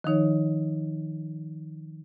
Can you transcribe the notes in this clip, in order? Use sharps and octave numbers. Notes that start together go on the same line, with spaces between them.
D#3 F3 D#4 C#5